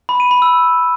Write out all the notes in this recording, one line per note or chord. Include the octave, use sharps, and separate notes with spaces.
B5
D#7
B5
E6